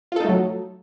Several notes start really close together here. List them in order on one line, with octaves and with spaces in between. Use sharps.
F4 A4 D#4 A3 F#3